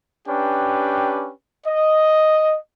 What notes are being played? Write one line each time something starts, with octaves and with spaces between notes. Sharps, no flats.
C#4 D4 G4 B4 G5
D#5